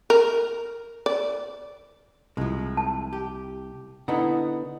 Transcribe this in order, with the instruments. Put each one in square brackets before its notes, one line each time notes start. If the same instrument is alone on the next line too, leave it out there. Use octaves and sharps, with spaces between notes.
[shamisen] A#4
D5
[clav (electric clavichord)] C2 [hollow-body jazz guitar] F3 G#3
[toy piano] A5
[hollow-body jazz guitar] G4
[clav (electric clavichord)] D3 B3 D#4 [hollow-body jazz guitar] E4 F#5 A#5